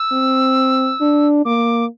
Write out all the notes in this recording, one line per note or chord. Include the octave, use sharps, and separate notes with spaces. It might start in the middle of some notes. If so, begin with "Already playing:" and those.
Already playing: E6
C4
D4
A#3 D6